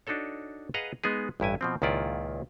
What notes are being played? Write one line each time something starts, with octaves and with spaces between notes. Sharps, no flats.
D4 D#4 F#4 A4 C#5
G#4 B4 D#5 F5 F#5 A#5
G#3 B3 D#4 G#4
A1 G2 E4 G#5
B2 F3 C4
C#2 A#2 D#3 E4 F4 D5